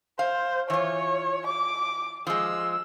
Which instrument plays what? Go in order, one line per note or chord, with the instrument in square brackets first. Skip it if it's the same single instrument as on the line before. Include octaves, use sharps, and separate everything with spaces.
[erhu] C5 [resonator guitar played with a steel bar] F5
[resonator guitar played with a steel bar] E3 F4 [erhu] C#5
[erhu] D6
[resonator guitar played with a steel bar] F3 G#3 [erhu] E6